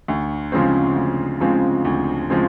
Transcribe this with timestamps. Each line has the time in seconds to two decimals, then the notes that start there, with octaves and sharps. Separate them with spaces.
0.08 D2
0.52 C#3 F3 G#3 C4
0.96 D2
1.40 C#3 F3 G#3 C4
1.85 D2
2.30 C#3 F3 G#3 C4